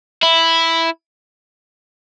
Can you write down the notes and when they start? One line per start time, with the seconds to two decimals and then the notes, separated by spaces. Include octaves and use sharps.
0.23 E4